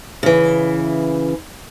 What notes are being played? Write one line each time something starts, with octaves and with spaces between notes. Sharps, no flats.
C#3 E3